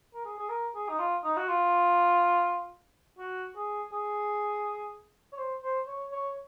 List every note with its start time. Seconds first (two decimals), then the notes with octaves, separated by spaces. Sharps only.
0.14 A#4
0.25 G#4
0.38 G#4
0.49 A#4
0.75 G#4
0.89 D#4
0.99 F4
1.24 D#4
1.37 F#4
1.48 F4
3.18 F#4
3.56 G#4
3.93 G#4
5.33 C#5
5.38 C5
5.63 C5
5.87 C#5
6.12 C#5